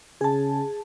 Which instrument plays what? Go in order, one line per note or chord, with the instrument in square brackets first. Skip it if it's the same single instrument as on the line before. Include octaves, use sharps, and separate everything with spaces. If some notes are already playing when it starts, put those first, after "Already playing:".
[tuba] C#3 [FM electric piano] G#4 A5